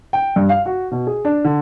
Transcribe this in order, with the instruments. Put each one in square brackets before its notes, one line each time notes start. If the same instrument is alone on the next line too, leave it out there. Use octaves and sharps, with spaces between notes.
[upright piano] G5
G2
F5
F#4
B2
G#4
D4
D3